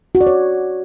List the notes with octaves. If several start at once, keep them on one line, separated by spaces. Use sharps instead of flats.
F#4
D5
C#5